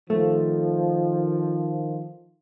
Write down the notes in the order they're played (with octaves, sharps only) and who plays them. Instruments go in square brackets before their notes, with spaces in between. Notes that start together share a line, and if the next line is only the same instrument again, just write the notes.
[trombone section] D#3 F3 [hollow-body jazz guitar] A3